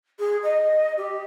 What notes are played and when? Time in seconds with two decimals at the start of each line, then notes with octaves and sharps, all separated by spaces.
0.19 G#4
0.43 D#5
0.97 G4